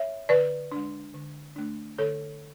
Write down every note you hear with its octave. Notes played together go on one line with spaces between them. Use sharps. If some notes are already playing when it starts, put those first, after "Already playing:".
Already playing: C#5 E5
D3 B4 D5
G#3 D4
D3
A3 D4
D3 A4 C#5